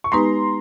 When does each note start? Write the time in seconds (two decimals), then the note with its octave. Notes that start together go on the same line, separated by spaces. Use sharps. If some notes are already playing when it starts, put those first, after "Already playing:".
0.04 C#6
0.12 G#3 B3 D#4 G4 B4 A#5 C6